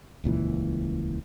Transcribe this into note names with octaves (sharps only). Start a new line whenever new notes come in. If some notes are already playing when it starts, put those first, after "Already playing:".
D#1 C#2 A#2 E3